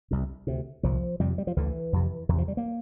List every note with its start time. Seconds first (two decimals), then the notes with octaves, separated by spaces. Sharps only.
0.11 C2 C3
0.47 D2 C3
0.83 C2 A#2 F3
1.20 F2 C3 G3
1.38 G3
1.47 F3
1.56 D2 D3 E3
1.93 F2 C3
2.29 E2 D3
2.34 C3 F3
2.48 G3
2.57 A#3